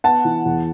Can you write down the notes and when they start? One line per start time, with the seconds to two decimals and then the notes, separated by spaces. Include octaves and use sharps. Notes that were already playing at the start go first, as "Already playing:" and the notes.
0.04 B3 F#5 A5
0.25 E3
0.46 E2